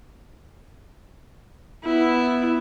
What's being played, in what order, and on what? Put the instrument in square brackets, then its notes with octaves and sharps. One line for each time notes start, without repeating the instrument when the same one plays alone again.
[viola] B3 E4